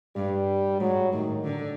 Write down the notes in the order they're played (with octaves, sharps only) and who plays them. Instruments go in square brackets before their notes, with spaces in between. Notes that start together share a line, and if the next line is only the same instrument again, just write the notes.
[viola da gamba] G2 [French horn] G3
[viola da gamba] G#2 [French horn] F#3
[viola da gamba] A2 [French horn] D#3
[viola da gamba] D3